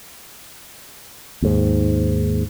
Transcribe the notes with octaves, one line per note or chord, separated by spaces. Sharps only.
D#2 G#2